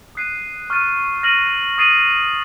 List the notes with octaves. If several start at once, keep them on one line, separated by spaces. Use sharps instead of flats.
D#6 F#6 C7 D#7
C#6 F6 A6 D#7
F6 A#6 D#7 F#7
D#6 A6 C7 D#7 F#7